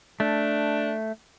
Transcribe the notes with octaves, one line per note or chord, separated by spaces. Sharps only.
A3 D4